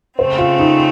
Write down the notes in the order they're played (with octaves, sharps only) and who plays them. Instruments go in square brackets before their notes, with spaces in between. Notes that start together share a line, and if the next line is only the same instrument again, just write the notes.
[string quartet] C#3 A3 C4 [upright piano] C5
[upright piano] F4
D#4